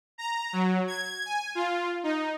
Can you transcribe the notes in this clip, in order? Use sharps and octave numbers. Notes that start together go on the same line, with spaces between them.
A#5
F#3
G#6
G#5
F4
D#4